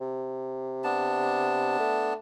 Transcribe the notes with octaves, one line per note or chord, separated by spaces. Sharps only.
C3
B3 D4 A5
A3